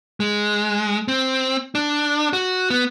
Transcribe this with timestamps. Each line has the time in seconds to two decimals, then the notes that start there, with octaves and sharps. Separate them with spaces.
0.20 G#3
1.08 C4
1.75 D4
2.33 F#4
2.70 B3